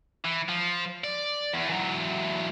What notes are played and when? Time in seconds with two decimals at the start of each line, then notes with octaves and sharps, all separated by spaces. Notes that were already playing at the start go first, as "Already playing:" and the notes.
0.25 E3
0.49 F3
1.04 D5
1.54 E2
1.70 E3 F#3